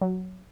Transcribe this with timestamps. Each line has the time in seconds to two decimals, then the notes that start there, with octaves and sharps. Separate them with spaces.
0.01 F#3